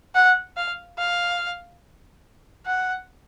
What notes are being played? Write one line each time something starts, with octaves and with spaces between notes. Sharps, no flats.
F#5
F5
F5
F#5